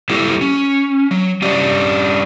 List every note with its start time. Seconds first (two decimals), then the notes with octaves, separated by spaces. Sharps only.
0.09 G3 A#3 E4 G4 A4
0.41 C#4
1.11 F#3
1.42 G3 C#4 D4 G4 D#5